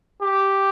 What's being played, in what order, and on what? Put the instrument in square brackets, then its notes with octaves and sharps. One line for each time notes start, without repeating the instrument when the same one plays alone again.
[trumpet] G4